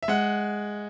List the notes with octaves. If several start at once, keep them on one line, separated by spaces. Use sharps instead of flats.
E5
G#3 F#5